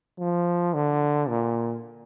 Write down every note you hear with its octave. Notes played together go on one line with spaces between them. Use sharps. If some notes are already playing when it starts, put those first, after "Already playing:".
F3
D3
A#2